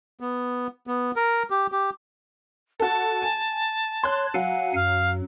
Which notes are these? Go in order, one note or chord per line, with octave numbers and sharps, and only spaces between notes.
B3
B3
A#4
G4
G4
F#4 A4 A5
G#5
C#5 C6 F#6
F#3 F5 F#5 G#5
F#2 F5